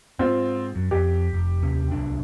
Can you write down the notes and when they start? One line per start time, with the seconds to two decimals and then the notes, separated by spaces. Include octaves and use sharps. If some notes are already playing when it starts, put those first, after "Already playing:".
0.19 G#2 C4 F4
0.75 F#2
0.91 F2 G4
1.33 F1
1.62 D#2 C3 C#4
1.91 D1 C2 D4